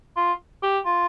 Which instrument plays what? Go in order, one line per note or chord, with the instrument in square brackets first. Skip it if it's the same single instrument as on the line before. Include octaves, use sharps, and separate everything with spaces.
[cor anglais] F4
G4
F4